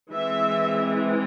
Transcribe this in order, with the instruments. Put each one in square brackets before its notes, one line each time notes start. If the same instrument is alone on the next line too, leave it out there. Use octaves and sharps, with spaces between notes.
[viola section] E3 G#3 C4 E5